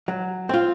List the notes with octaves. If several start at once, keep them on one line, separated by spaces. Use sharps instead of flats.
F#3
C4 F4